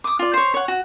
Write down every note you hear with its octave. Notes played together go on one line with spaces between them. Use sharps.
D6 D#6
F4 D5
C5 C#5
C#5 F#5
F#4